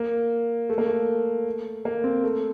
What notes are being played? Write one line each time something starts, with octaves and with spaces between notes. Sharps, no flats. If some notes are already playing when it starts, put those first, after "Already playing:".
Already playing: A#3
A3
A#3
A3
A#3
C4
A3